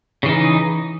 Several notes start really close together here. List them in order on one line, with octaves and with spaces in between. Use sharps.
C#3 E3 D#4